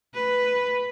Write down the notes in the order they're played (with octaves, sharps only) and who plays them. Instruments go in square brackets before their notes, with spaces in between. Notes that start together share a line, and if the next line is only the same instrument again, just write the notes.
[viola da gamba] B4